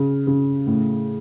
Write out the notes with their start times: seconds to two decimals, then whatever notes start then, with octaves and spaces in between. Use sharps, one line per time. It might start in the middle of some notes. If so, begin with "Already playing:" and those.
Already playing: C#3
0.27 C#3
0.67 A2